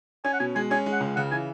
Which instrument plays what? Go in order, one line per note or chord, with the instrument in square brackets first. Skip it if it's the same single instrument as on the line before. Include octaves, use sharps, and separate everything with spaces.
[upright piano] C#4 [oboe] G#5
[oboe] F#5
[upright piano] B2 [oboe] G#5
[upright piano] G#3 [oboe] G#5
[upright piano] C#4 [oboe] G#5
[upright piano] G#3
[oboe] F#5
[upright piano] C#2
[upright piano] C#3 [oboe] F#5
[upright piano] E3 [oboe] G#5